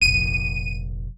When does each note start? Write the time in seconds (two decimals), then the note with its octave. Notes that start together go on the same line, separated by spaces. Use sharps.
0.02 F1 A#1 D#7